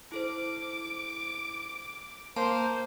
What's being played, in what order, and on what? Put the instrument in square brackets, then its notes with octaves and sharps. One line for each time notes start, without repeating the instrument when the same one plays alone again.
[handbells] E4 A4 C5 [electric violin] D6
[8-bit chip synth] A#3 [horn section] C5 [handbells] A5